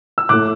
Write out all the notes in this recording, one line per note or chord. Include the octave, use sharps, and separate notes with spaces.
E6
A2 A3 D6 F#6